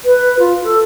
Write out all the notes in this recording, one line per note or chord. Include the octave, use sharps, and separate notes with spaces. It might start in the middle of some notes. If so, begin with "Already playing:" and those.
B4
F4
A4